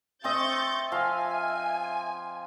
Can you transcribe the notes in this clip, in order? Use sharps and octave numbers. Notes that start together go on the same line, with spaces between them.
C4 D#5 E5 C#6 G6 A6
F3 F5 G#5